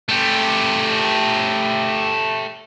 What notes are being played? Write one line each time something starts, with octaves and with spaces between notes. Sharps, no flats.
A3 G4